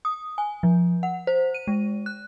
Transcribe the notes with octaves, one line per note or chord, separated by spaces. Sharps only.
D#6
G#5
F3
F#5
C5
D#7
G#3
F#6